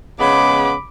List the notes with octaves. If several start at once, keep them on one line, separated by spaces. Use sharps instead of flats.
C#3 G#3 B3 B5 D6